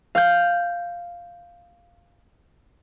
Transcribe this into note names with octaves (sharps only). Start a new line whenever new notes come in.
F5 F6 G6